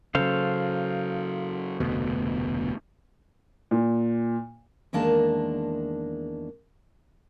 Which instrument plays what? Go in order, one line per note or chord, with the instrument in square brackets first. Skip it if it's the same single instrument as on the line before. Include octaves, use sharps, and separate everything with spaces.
[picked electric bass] C#3 F#3 [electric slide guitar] A4 C5 F5
[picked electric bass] F1 D2 B2
[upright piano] A#2
[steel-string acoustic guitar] E2 D#3 G#3 A#3 D4 A5